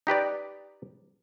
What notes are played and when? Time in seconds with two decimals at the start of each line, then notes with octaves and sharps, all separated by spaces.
0.07 D#4 G4 B4 D5